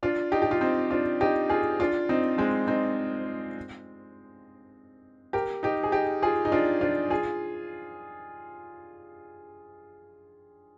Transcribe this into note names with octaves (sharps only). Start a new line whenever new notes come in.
D4 F4
D#4 G4
G4
F4
C4 D#4
D4 F4
D#4 G4
F4 G#4
D4 F4
C4 D#4
G#3 C4
C4 D#4
G4 A#4
D#4 G4
G#4
D#4 G4
F4 G#4
D#4
D4 F4
D4 F4
F4 G#4